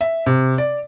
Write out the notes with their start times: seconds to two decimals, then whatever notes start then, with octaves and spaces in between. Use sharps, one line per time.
0.01 E5
0.26 C3
0.58 D5